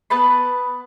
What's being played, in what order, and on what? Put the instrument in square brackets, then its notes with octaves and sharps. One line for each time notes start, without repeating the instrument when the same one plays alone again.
[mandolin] B3 B4 A5 B5